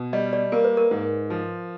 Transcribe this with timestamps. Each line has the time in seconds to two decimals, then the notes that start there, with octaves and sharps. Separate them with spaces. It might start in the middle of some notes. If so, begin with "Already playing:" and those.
Already playing: B2
0.13 G3 D#5
0.33 D5
0.52 A#3 A#4
0.64 B4
0.77 A#4
0.91 G#2
1.30 F3